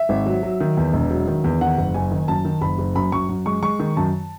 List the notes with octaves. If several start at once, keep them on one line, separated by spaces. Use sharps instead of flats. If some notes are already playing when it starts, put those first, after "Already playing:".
Already playing: E5
G#1
F#3
F#3
D#3
E2
E1
F#3
D#3
E2
D#3 F#5
F#1
F#1 G#5
D#3
F#2 A5
D#3
F#1 B5
F#1
F#2 B5
F#2 C#6
F#2
G#3 C#6
G#3 C#6
D#3
F#2 A5